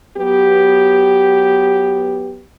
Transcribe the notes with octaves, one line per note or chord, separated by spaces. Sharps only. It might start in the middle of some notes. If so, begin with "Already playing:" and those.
F#3 B3 G4